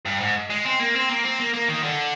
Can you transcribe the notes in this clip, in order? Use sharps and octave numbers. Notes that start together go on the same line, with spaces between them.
G2
G#2
G#3
C4
A#3
C4
A#3
C4
A#3
A#3
D#3
D3